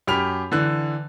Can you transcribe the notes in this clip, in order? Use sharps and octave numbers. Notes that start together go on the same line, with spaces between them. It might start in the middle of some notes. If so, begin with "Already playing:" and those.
F#2 G4 B5 F6 F7
D3 E3 F#6